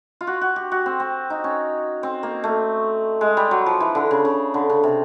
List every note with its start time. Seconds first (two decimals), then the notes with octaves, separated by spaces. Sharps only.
0.21 F4
0.27 F#4
0.41 F#4
0.56 G4
0.72 F#4
0.86 C4
1.00 C4
1.30 D#4
1.44 C#4
2.03 C4
2.23 A#3
2.44 A3
3.21 G#3
3.37 G3
3.51 F#3
3.66 F3
3.80 E3
3.95 D3
4.11 C#3
4.25 C#3
4.54 D3
4.70 C#3
4.84 C3